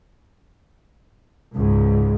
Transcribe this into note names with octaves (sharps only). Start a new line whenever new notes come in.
C#2 G#2